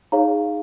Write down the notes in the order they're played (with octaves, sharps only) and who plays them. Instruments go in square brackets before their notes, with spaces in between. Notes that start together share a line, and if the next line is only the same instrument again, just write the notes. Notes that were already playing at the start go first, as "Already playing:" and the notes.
[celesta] D#4 G#4 C#5 F5 A#5